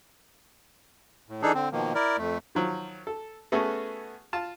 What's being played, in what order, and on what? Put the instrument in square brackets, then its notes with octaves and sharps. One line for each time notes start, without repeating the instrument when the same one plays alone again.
[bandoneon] A2
E3 D4 D#4 G#4 A4
D3 C4
B2 D#3 F3 A#3
E4 A#4 D5
F2 A3
[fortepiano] D#3 F3 F#3
A4
A3 B3 C#4 F#4 G#4 A4
F4 A5